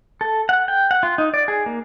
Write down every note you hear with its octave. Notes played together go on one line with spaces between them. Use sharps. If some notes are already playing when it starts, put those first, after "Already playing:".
A4
F#5
G5
F#5
F4
D#4
D5
G#4
A#3